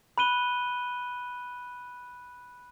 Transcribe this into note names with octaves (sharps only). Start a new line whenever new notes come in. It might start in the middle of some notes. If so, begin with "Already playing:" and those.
B5 F#6 D#7 G7